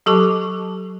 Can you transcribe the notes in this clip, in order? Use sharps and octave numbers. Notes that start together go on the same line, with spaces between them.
F#3 G4 A4 A5 C#6 D6